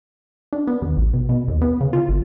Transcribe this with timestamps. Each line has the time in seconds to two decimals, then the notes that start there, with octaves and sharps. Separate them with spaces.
0.53 D4
0.67 B3
0.82 D#2
0.97 A1
1.14 B2
1.29 B2
1.48 D#2
1.62 B3
1.81 C#3
1.93 F4
2.09 G1